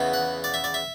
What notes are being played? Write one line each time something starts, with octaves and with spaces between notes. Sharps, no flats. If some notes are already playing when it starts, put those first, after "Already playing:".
Already playing: E2 C#3 E3 B3
F#5
D5
E5
D5
E5